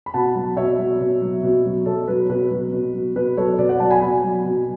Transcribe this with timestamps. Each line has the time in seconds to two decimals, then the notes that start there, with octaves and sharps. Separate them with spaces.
0.06 B5
0.14 B2 F#5 A5
0.35 F#3
0.57 B2 C#5 E5
0.79 F#3
1.00 B2
1.22 F#3
1.43 B2
1.65 F#3
1.86 B2 A4 C#5
2.08 F#3 B4
2.30 B2 B4
2.51 F#3
2.73 B2
2.94 F#3
3.16 B2 B4
3.37 F#3 A4 C#5
3.58 B2 B4 D5
3.69 D5 F#5
3.80 F#3 F#5 A5
3.91 G#5 B5
4.01 B2 G#5 B5
4.23 F#3
4.45 B2